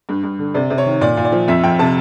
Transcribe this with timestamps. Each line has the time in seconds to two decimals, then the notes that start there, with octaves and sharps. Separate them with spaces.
0.09 G2
0.23 G2
0.39 D3
0.54 C3 D5
0.70 C3
0.78 C#5
0.86 D#3
1.01 A#2 D5
1.17 A#2
1.25 D5
1.32 F3
1.48 F2 E5
1.63 F2 G5
1.79 C3 A5